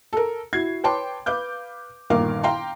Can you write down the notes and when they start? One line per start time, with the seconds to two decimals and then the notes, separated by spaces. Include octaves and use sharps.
0.13 A4 A#4
0.53 E4 F#4 G#6 C7
0.84 B4 C#5 G5 A5 C6 D6
1.26 B4 F5 D6 G6
2.10 G1 A#2 D#3 A#4 F5 D6
2.43 F5 G5 A#5 C6